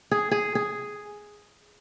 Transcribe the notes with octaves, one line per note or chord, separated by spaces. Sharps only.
G#4
G#4
G#4